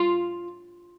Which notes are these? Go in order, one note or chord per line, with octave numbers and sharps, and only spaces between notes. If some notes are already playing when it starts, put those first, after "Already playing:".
Already playing: F4